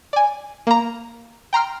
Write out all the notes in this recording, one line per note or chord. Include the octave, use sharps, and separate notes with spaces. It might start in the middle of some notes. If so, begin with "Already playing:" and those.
D5 G#5
A#3 A#5
G5 A#5 C6 F6